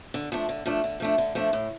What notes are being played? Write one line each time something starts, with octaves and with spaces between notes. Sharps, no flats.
D3
F3 A3 D4
D3
F3 A3 D4
D3
F3 A3 D4
D3
F3 A3 D4
A2